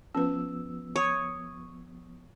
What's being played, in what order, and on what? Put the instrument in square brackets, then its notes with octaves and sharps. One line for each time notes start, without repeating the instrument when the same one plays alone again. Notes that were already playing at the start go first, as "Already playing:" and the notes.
[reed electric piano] F3 B3 E6 [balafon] C#4 B4
[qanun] C#5 [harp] C#6 D#6